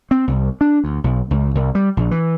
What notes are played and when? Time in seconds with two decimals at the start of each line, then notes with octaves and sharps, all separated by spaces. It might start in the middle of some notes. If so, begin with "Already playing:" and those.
0.11 C4
0.28 C2
0.61 D4
0.84 D2
1.04 B1
1.31 C#2
1.55 C2
1.75 G3
1.97 A#1
2.11 E3